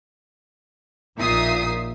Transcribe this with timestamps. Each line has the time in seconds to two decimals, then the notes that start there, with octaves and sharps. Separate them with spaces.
1.16 A#1 A#2 D#4 E5 D#6 C7